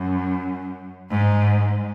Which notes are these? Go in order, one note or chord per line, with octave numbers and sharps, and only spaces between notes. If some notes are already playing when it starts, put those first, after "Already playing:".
Already playing: F#2
G#2